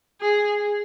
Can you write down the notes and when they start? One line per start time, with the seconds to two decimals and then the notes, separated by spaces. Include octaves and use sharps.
0.21 G#4